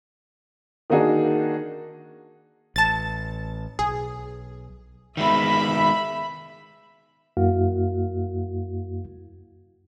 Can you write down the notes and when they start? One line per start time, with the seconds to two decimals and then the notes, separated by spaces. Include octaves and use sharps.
0.90 D#3 A#3 D4 D#4 F#4 G#4
2.76 A1 A5 A6
3.79 B1 G#4
5.17 D#3 G#3 B3 E5 B5
7.37 F#2 A#3 E4 F#4 F5